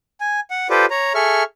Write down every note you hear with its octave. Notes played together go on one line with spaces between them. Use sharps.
G#5
F#5
F4 G4 A4 B4 C5 D5
C#5 A#5
G#4 A4 E5 C#6 F6